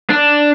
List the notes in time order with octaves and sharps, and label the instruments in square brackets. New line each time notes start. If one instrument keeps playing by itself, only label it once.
[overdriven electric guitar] D4